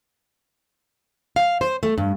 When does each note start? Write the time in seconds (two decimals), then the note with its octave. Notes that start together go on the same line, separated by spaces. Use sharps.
1.36 F5
1.61 C5
1.83 A3
1.98 G2